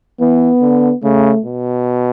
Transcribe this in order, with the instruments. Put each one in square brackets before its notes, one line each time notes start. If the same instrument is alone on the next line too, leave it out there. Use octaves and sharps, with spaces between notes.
[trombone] E3 [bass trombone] B3
[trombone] D3
[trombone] C#3 [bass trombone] A3
[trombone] B2